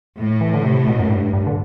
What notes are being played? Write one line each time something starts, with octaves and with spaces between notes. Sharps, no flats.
A2
E3
D3
C3
B2
F#2
G2
G2
D3